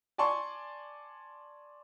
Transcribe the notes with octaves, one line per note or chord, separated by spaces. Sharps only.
D5 G#5 A5 C6 C#6